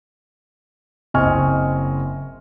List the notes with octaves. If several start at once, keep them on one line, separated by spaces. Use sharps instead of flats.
F#1 C4 D#5 G#5 C#6 F6